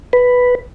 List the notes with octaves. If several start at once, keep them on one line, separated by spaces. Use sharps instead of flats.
B4